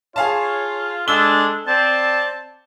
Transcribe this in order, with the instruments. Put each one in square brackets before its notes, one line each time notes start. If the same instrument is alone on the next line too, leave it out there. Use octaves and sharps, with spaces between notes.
[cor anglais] F4 [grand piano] G#4 F5 A5 [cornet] C#5
[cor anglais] G#3 [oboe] D4 [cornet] A4 [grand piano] E6 G7
[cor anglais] C4 [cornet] D5 [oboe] A5